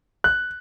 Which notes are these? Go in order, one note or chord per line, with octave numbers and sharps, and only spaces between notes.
F#6